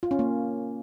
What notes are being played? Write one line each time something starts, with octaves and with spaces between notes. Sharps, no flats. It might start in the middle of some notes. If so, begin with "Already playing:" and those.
F4
C#4
A#3